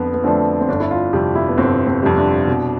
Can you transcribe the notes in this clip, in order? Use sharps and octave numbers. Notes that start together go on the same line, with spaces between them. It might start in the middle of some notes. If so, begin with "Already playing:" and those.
Already playing: F2 D3 F3 B3
B3
D3 F3 A3 C4 D4
C4
G1 D4
E4
F4
F2 C3 G3 G4
E4
B3
G1 C4
C4
F2 C3 G3
D4
B2